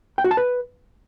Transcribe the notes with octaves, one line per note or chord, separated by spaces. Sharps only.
G5
F#4
A5
B4